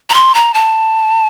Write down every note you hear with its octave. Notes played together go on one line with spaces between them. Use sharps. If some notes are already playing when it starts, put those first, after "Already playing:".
A#5
C6
A#5
A5